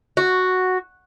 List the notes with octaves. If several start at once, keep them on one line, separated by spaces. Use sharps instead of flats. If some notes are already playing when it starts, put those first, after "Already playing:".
F#4